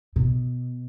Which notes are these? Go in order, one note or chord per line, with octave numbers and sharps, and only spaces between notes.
B2